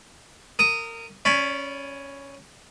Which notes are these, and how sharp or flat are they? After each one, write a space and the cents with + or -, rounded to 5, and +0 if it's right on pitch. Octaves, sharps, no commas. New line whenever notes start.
A#4 -25 D#6 +0
C#4 +0 D5 -25 B5 +0